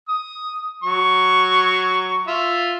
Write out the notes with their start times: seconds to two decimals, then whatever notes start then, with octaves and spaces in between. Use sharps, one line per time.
0.09 D#6
0.83 F#3 C#6
2.27 F4 E5